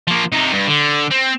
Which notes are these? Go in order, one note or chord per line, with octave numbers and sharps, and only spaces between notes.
F3 A#3
C3 D#4
G2
D3
C4